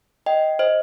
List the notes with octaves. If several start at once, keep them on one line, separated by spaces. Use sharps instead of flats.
D#5 G5
C5 D#5